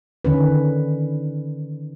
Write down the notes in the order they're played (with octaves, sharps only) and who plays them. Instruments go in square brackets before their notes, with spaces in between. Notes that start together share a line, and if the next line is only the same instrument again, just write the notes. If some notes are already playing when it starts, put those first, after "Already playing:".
[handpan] D3 D#3 C#4 B4